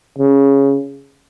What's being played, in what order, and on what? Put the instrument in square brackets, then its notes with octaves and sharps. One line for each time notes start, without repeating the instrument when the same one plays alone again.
[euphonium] C#3